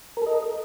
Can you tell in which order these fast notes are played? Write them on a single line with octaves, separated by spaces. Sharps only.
A#4 A4 D#5